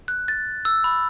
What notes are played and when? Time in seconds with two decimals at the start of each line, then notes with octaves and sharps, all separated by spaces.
0.08 F#6
0.28 A6
0.65 E6
0.84 B5